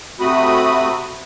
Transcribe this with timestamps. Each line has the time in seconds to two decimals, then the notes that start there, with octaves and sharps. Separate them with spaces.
0.20 C3 A3 C4 F#4 B5 D#6